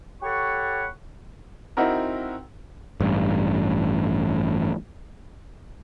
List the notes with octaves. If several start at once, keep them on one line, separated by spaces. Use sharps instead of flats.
G4 A4 C#5 F#5 B5 C#6
C4 D#4 E4 F#4 A#4
A1 G2